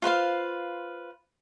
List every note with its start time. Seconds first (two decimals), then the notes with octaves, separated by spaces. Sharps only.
0.02 F4 B4 C5 F5